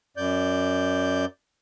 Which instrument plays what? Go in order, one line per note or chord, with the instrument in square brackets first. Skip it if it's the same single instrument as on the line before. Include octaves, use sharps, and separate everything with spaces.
[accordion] F#2 D5 G6